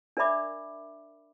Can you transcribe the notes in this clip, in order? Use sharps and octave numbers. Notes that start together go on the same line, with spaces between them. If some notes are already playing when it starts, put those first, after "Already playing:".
D4 A#4 D5 E5 B5 D6